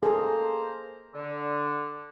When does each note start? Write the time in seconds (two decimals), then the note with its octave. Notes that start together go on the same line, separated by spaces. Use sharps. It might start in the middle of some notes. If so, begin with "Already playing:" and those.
0.03 A#3 G#4 A4 C5 A#5
1.15 D3